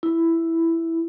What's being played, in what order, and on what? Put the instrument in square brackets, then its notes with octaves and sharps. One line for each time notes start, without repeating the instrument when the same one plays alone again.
[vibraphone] E4